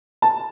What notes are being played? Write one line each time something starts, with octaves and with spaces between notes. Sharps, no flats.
A5